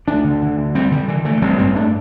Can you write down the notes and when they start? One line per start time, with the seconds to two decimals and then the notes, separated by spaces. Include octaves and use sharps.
0.07 D2 A3 D4
0.24 D3
0.42 D3
0.58 D2
0.75 D2 G3 C4
0.91 D2 D3 G3
1.08 D3 E3
1.25 D3 E3 A3
1.41 A1 G3 C4
1.58 G2 G3 C4
1.75 G2 A3 D4